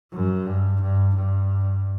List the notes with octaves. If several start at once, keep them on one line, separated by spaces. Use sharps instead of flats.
F#2
G2
G2
G2